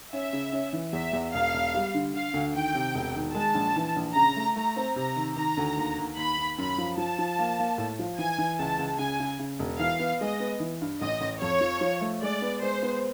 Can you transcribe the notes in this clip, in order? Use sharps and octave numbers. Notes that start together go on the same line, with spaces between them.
C#4 E5
C#3
C#4
E3
E2 E5
E2
E1 F5
E1
G3
D3
D3 F5
D2
D#3 G5
C3
E1
D#3
G#3 A5
A#1
E3
A#1
C#3 A#5
A3
A3 A#5
C4
C3 A#5
D#3
D#3 A#5
D2
D#2
D#2
D#2 B5
D#2
F#2 B5
F3
F3 A5
F3
A#3
A#3
A2
F3
E3 G#5
E3
C#2 A5
C#2
C#3 G#5
C#3
C#3
E1
E3 F5
B3
G#3 D#5
B3
E3
G2
A1 D#5
A1
F2 C#5
F3
F3
A3
G#3 D5
B3
G#3 C5
B3